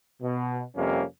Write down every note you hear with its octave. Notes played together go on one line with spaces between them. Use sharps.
B2
F2 C3 G3 A#3 C#4